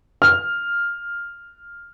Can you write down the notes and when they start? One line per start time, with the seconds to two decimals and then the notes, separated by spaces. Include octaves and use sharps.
0.22 F6